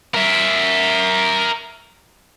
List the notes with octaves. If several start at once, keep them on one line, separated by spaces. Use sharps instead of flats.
A#4 E5